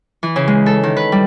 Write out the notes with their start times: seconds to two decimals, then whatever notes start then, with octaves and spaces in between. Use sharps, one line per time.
0.23 E3
0.36 C#3
0.48 G#3
0.66 A4
0.83 D#3
0.97 B4
1.12 G3